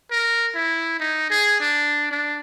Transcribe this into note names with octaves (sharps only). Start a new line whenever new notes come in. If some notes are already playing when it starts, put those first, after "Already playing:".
A#4
E4
D#4
G#4
D4
D4